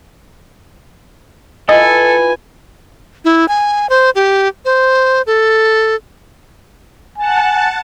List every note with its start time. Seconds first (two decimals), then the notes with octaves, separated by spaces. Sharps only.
1.69 E4 F4 A4 B4 D#5 G#5
3.25 E4
3.48 G#5
3.89 C5
4.15 G4
4.65 C5
5.27 A4
7.18 F#5 G#5 A5